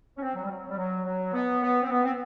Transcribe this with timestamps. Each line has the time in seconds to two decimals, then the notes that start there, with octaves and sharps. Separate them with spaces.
0.17 C#4
0.21 C4
0.35 F#3
0.43 G3
0.49 F#3
0.70 G3
0.77 F#3
1.05 F#3
1.33 B3
1.61 B3
1.82 C4
1.89 B3
2.03 C4